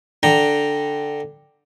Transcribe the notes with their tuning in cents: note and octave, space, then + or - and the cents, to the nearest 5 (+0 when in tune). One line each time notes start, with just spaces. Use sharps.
D3 +0 G5 +0 A#5 +0